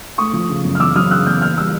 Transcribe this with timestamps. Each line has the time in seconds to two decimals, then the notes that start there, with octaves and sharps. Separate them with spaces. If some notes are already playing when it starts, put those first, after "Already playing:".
0.18 A3 C#6 D#6
0.33 F3
0.49 C#3
0.65 F#2
0.75 F6
0.80 E2 D6 E6
0.96 F#3 D#6 F6
1.11 C#3 E6 F#6
1.27 E2 F6 G6
1.42 A#3 F6 G6
1.57 G3 E6 F#6